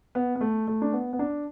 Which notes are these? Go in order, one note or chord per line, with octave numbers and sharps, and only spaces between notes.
B3
B3
A3
A3
D4
B3
B3
D4